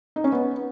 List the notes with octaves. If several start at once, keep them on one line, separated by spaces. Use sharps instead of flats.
D#4
C#4
B3